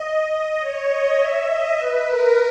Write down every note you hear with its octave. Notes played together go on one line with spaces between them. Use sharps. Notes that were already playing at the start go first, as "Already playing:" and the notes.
Already playing: D#5
D#5
C#5
D#5
E5
D#5
B4
A#4